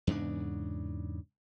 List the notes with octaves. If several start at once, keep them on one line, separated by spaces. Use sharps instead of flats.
E2 G#2 C#3 D4